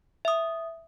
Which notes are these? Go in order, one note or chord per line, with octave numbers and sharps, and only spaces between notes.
E5 D#6